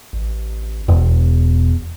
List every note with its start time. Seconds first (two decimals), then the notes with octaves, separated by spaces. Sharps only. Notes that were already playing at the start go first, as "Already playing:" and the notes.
0.13 A1
0.88 E1 E2